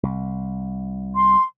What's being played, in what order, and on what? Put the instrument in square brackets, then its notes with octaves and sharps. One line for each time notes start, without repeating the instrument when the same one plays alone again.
[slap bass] C2
[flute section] C6